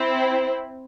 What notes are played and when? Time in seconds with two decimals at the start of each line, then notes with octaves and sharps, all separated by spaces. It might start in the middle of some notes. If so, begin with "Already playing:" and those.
Already playing: C4 E4